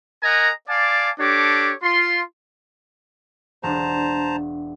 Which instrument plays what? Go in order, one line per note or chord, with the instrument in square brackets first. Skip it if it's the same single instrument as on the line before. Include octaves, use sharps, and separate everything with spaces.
[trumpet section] A#4 D#5 F#5 G#5 A#5
D5 F5 G#5 A5 D6
D4 G4 A4 C#5 D6
F4 C6
[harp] E1 D4 [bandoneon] C5 A5 A#5